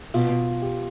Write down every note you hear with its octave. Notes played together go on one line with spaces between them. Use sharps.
B2 F4
G4